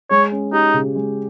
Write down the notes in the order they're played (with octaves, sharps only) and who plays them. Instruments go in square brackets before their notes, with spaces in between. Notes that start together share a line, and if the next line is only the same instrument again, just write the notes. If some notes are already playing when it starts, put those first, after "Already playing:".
[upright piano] G#3 [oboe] C#5
[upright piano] C#4
[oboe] D#4 [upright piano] G4
[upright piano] C#3
G#3